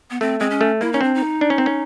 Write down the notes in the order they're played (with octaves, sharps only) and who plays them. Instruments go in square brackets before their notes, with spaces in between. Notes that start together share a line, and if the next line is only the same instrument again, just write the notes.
[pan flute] B3
[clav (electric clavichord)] A3 [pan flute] C4
[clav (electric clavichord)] G#3 [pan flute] C4
[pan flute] C#4
[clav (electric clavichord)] A3
[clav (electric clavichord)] A#3 [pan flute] E4
[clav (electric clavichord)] C#4 [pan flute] D#4
[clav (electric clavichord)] C4 [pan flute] D4
[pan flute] D#4
[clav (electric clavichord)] D4
C#4
C4
C#4